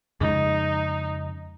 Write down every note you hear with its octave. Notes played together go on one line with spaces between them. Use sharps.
F2 C#3 G#3 D#4